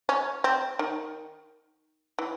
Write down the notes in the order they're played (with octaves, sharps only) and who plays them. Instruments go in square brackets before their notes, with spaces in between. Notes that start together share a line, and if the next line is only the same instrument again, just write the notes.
[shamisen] C#4
C4
D#3
E3